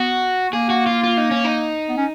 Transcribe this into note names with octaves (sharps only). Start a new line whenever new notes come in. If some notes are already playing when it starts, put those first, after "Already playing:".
Already playing: B3 F#4
A#3 G#4
F#4
F4
F4
D#4
C#4
D#4
B3
C#4